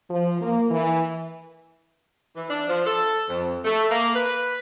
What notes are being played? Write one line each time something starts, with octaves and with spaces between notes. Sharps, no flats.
F3
A#3
E3
E3
D4
F3
A4
F2
A3
A#3
B4